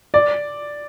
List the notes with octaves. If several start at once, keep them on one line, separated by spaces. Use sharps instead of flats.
D5